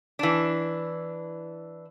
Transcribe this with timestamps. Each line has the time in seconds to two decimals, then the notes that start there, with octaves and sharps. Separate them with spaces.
0.19 E3 D4